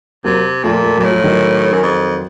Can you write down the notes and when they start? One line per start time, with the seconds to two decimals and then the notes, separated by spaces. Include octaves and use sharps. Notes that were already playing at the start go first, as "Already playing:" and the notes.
0.24 C3 F#3 A#3
0.64 A#2 F3 A3
0.84 A3
0.97 A#2 F#3
1.04 A2
1.11 F3
1.24 D#3 F#3
1.73 F#2
1.82 F2